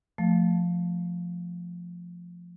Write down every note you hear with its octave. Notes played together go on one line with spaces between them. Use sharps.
F3 A3